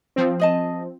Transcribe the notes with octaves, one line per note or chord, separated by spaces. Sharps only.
F3 C4
G#4 D#5 A5